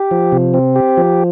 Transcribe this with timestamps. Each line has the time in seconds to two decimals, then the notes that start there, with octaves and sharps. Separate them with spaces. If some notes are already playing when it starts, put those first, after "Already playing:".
Already playing: G4
0.11 F3
0.32 C3
0.54 C4
0.76 G4
0.98 F3